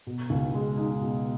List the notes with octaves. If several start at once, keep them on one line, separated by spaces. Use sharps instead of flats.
B2
C#2
G#3
D#4
B2